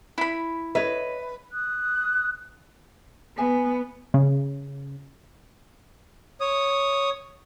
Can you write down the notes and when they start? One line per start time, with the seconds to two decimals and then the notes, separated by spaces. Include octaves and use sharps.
0.18 E4 B5
0.75 B4 C#5 D#5 E5
1.53 D#6 F#6
3.38 B3 E5 G#5
4.14 C#3
6.41 C#5 D#6